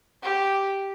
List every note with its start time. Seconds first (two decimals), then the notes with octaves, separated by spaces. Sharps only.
0.23 G4